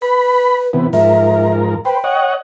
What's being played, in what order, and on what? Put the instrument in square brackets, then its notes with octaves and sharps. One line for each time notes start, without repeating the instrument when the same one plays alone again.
[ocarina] B4 [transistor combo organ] B5
[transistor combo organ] C3 E3 B3
[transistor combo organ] G#2 F3 A#4 [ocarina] E5
[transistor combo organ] B4 C5 [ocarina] G5
[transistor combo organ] C#5 D#5 F#5